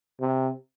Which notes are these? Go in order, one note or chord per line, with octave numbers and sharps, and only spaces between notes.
C3